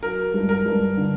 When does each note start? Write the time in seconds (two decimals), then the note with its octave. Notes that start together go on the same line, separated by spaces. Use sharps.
0.02 F#3 A#4
0.34 G2
0.49 A#4
0.65 G2
0.97 D3